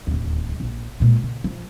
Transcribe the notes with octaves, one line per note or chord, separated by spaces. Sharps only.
D1 D#2
A#1
A#2 G#3
C#3
F3